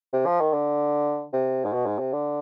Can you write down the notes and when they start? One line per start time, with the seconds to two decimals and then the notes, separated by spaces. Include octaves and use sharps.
0.13 C3
0.26 F3
0.40 D#3
0.53 D3
1.33 C3
1.65 G#2
1.73 B2
1.86 G#2
1.99 C3
2.13 D3